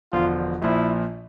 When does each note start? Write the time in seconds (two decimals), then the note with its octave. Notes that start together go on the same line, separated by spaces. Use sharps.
0.13 E1 E2 D3 F3 F4
0.62 A#1 A#2 F3 E4